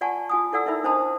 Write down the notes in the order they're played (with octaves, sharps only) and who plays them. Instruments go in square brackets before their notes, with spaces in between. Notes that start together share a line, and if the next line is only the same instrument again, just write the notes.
[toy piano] F4 D5 F#5 G#5 A5 C#6
F4 G#5 D#6
E4 A4 D5 F#5 E6
D#4 E4 A#4 E5 B5
D4 C5 D#5 A5 B5 D#6